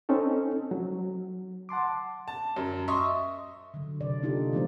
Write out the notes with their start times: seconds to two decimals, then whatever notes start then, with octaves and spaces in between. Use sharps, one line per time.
0.09 C4 C#4 D#4 A4
0.71 F#3
1.69 F#5 A5 C6 D6
2.28 A5
2.56 F#2
2.88 D#5 E5 C6 C#6 D#6
3.74 D3 F#3
4.00 C3 D5
4.22 A#3 D4 D#4 F4 G4 A4
4.53 E3 F3 G#3 B3 D#4 C5